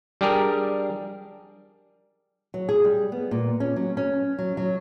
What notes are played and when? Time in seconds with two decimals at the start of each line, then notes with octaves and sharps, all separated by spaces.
0.21 G3 D4 G4 G#4 A#4
2.54 F#3
2.69 G#4
2.84 G3
3.12 B3
3.31 A#2
3.60 C#4
3.76 F#3
3.97 C#4
4.39 F#3
4.57 F#3